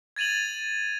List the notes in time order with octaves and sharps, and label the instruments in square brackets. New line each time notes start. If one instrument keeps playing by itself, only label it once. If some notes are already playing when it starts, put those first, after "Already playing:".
[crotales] G#6 A6 D#7 F7 F#7